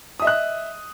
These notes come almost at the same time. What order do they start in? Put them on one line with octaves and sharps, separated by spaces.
D#6 E5 D#5 F#6